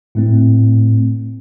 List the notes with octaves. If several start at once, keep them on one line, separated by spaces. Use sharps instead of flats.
A2 A3 C4